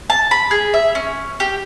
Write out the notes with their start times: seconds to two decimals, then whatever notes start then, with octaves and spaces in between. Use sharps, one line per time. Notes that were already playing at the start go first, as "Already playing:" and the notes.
0.10 A5
0.31 B5
0.51 G#4
0.74 E5
0.95 C#4
1.40 G4